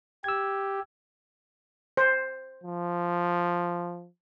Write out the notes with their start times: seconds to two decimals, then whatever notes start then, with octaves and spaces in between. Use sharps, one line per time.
0.24 G4 E6 G#6
1.97 C5
2.64 F3